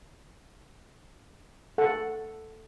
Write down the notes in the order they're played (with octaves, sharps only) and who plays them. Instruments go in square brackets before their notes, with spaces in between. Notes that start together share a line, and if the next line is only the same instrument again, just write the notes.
[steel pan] A4 F#5